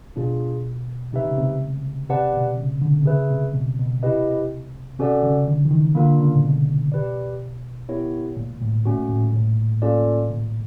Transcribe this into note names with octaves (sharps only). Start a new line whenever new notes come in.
B2 D4 F4 G#4
C3 D#4 G4 B4 E5
C#3
C3
C3 G4 B4 D5 F#5 A5
B2
C#3
D3
C3
C#3 G#4 B4 E5
C3
B2
B2
C3 E4 G4 B4 D#5
C3 C#4 F#4 A4 D5 F#5
C#3
D3
E3
D#3
D3 A#3 D4 F4 A#4
C#3
A#2
B2
G4 B4 D5
B3 E4 G4 A#4 C#5
A#2
A2
A#2 A3 C#4 F#4
A2
A2
A#3 C#4 F4 A4 D5
A#2